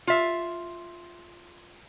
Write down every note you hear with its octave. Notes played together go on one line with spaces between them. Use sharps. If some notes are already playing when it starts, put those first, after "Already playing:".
F4 E5